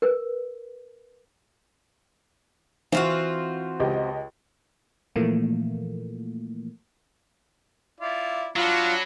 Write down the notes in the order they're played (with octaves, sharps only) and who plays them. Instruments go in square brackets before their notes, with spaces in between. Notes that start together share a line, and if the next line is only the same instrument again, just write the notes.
[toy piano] A#4 B4
[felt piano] E3 [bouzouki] C4 F4 F#4
[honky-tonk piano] C#2 G4 D#5
[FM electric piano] A#2 E3 F3 A3 A#3
[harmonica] E4 F4 D5
[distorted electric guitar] F#3 [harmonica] D4 F#5 B5 [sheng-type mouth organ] F4